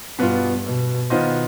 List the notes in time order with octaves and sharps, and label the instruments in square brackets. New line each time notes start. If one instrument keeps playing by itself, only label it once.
[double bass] G2 [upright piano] B2 B3 F4
[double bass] B2
[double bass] B2 [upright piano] D#3 B3 F4 C5 D#5